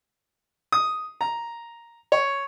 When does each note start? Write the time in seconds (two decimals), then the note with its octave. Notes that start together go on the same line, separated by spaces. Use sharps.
0.72 D#6
1.21 A#5
2.12 C#5